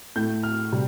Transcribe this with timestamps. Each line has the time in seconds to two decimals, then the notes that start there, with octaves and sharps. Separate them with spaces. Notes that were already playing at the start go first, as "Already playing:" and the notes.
0.16 A2 A3 G6
0.43 F6
0.72 C3 G3